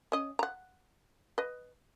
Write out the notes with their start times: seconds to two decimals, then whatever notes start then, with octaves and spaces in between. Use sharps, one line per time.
0.12 C#4 D#5
0.39 F#5 A#5
1.38 B4 D#5